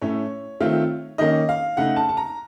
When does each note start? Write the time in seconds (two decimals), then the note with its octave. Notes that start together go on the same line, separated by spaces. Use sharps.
0.01 A2 A3 C#4 C#5
0.60 D#3 A3 C4 F4
1.18 D#3 A#3 C#4 D#5
1.49 F5
1.77 C#3 A3 D#4 F#5
1.96 A5
2.09 A5
2.17 A#5